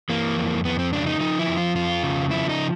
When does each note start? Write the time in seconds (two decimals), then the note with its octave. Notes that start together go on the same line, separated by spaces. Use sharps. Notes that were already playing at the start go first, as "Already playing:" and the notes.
0.09 E3 A#3
0.37 F2
0.65 F2 B3
0.79 C4
0.93 C#3 D4
1.07 D#4
1.20 F3 D#4
1.39 E4
1.48 F2
1.57 F4
1.75 F2 F4
2.03 C#3
2.31 F3 E4
2.49 D#4